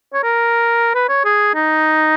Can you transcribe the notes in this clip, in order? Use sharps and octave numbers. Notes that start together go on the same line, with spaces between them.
C#5
A#4
B4
C#5
G#4
D#4